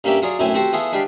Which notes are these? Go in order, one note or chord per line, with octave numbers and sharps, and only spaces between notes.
G2 A#3 C#4 G4 E5 D6
F#3 F4 G#4 D5
B1 F#2 A2 C4 E4 G#5
C4 F#4 G4 A4 C5
E3 B3 F4 G#4 A4
G#3 D4 G4 B4 D5 F5